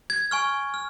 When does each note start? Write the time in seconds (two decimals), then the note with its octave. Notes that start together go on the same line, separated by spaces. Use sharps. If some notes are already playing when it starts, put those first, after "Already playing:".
0.10 G#6
0.31 G#5 C#6 F6
0.74 F6